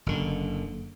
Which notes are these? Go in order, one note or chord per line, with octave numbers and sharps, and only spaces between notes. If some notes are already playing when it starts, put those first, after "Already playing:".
F#1 D3